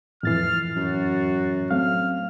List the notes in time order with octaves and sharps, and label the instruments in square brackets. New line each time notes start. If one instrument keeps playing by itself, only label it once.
[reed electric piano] F2 E3 [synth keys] A2 A6 C7 [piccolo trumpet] F6
[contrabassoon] F#2 [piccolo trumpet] F#4
[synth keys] F#3 A3 C4 [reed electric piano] F5 [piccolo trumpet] F6